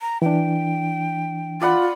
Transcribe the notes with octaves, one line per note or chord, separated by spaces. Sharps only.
A#5
E3 D4 G5
F4 D5 F#5 B5